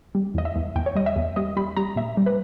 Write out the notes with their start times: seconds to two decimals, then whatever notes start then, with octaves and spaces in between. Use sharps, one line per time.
0.15 G3
0.34 E2 D#5
0.45 E5
0.56 E2
0.76 E2 G5
0.86 C#5
0.95 G3 D#5
1.06 E5
1.16 E2
1.36 G3 D#5
1.57 G3 B5
1.77 G3 A#5
1.96 A#2 E5
2.17 G3
2.26 B4